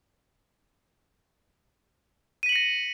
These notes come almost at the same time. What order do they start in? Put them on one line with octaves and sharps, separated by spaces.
D#7 B6 F#7 C#7 A#6